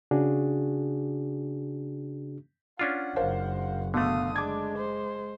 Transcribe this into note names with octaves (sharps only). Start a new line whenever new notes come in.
C#3 D4 F#4 G#4
C#4 D4 F4 F#5
F#1 A#4 C5 F5
F#5
B2 D3 A3 F5 D#6
G#3 D4 D6 G#6
C5